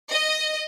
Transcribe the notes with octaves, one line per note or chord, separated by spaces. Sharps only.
D#5